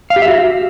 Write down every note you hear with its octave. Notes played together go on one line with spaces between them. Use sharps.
F5
G4
E5
F#4